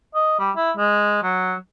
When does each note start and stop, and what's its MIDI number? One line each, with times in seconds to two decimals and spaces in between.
0.15 0.34 75
0.39 0.51 55
0.56 0.71 64
0.77 1.21 56
1.23 1.55 54